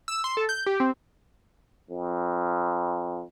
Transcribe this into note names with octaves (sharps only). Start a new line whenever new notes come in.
E6
C6
A4
G6
G4
C4
F2